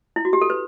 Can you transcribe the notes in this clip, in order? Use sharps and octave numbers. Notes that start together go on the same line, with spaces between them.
E4
F#4
G4
A4
B4